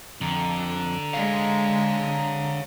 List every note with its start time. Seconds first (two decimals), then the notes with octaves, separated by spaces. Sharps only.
0.21 F2 D3 A#5
1.13 G#3 C#5 F5